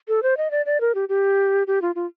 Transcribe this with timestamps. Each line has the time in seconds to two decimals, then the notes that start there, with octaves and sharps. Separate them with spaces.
0.08 A4
0.23 C5
0.37 D#5
0.51 D5
0.66 D5
0.81 A#4
0.95 G4
1.09 G4
1.67 G4
1.82 F4
1.95 F4